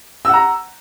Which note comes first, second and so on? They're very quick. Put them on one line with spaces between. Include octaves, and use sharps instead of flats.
E6 F#5 A#5